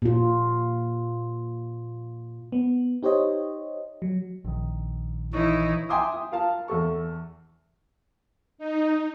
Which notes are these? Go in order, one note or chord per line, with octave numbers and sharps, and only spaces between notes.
A#2 F4
B3
D#4 G4 C5 C#5 D#5
F#3
A#1 D#3
E3 D#4 E4 C#5
E5 G5 G#5 C6 D6 D#6
D#6
F4 A#4 F5 A5
E2 A4 C#6
D#4